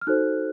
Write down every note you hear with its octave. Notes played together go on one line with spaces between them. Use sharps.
F6
D#4 F#4 A4 C5 F#6